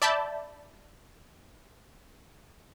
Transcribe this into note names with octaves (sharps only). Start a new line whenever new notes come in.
D5 E5 A5 B5 G6